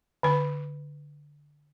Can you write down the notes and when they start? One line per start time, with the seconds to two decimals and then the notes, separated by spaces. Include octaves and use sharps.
0.23 D3 B4